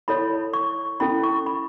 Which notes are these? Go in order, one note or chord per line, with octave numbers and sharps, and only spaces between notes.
E4 A4 C#5 B5
C#6
C#4 E4 A4 B5
C#6
B5